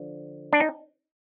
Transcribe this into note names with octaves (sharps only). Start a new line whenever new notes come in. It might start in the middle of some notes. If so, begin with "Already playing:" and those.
Already playing: D3 F3
D4
D#4